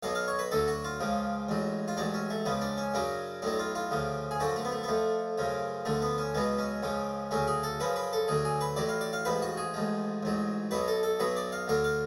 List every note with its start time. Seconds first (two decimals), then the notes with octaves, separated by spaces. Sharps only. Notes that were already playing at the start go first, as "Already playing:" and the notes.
0.03 B1 B2 F#3 F5
0.15 F5
0.28 C#5
0.39 B4
0.51 D2 D3 F#3 A4
0.68 F#4
0.84 F4
1.00 C#2 C#3 F3
1.49 A1 G#2 F#3
1.88 F4
1.97 A1 G#2 F#3 D4
2.14 C#4
2.30 A3
2.45 C#2 C#3 F3 B3
2.61 D4
2.78 C#4
2.94 F#2 C#3 F#3 D4
3.42 B1 A2 F#3 D4
3.59 F4
3.75 F4
3.91 D2 C#3 F3
4.31 G#4
4.40 F#2 D3 F3 F#4
4.56 A3
4.65 B3
4.72 A3
4.83 B3
4.88 F2 F3 A3
5.38 F#2 C#3 F3
5.85 D2 D3 F3 A3
6.02 B3
6.18 C#4
6.34 C#2 B2 F#3 B3
6.58 C#4
6.83 C#2 C#3 F3
7.31 D2 C#3 F#3 C#4
7.47 G#4
7.63 A4
7.80 F#2 C#3 F3 B4
7.96 B4
8.13 A4
8.28 D2 D3 F#3 G#4
8.45 G#4
8.61 B4
8.76 A1 A2 F#3 D5
8.89 F5
9.01 D5
9.13 F5
9.25 A1 G#2 F3 B4
9.42 F#4
9.57 G#4
9.74 A1 G#2 F3
10.23 A1 G#2 F#3
10.71 B1 B2 F#3 B4
10.88 A4
11.03 A4
11.19 B1 B2 F#3 B4
11.36 D5
11.52 F5
11.68 D2 D3 F#3 F5
11.84 F5